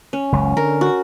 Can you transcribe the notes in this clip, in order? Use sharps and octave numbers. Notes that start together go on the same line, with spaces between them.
C#4
F#1 C#2
D3 A#4
F#4